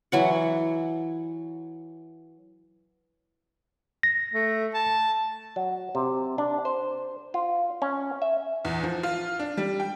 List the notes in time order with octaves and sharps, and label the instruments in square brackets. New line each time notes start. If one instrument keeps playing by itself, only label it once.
[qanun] E3 F#3 F#5
[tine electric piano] A#6
[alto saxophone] A3
A5
[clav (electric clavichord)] F#3
C3
D4
C5
F4
C#4
E5
[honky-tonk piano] E2
F3
F4
D4
G3
G5